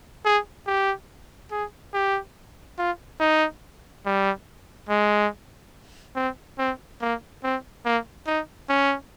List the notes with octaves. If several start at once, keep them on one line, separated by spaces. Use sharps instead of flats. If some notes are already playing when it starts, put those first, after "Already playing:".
G#4
G4
G#4
G4
F4
D#4
G3
G#3
C4
C4
A#3
C4
A#3
D#4
C#4